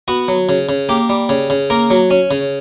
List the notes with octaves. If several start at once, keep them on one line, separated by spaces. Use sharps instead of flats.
B3 F#4
F#3
C#3
C#3
A#3 G4
G3
C#3
C#3
A#3 A#4
F#3
C#4
C#3